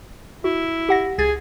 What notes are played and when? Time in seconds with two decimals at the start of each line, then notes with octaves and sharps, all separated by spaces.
0.44 E4 F#4
0.89 G4 F#5 A#6
1.18 C#2 G#4 G#6 A6